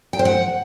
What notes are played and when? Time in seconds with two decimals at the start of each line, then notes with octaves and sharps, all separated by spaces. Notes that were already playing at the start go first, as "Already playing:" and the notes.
0.13 G5
0.19 C5
0.25 F#5